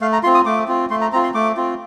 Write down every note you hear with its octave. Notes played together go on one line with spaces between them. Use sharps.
A3 F5
A#5
C4 F4 C6
D#6
A3 D6
C4 F4
A3 C6
A#5
C4 F4 A#5
C6
A3 D6
C4 F4